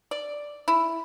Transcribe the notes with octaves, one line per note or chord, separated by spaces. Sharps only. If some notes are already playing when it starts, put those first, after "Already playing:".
D5
E4